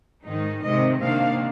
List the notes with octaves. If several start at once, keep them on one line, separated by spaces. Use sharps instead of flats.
G#2 D#3 G#3 D#4
C3 D#3 G#3 D#5
C3 D#3 A#3 D4 F5